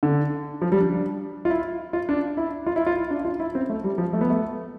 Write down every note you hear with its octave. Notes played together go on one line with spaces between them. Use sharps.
D3
F3
G3
D4
F4
E4
F4
D4
E4
F4
E4
F4
E4
D4
F4
E4
C4
A3
G3
F3
A3
B3
A3